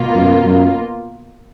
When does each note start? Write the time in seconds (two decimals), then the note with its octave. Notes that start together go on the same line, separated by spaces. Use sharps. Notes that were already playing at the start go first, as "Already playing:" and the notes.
Already playing: B2 A#3 F4
0.15 F#2
0.44 F#2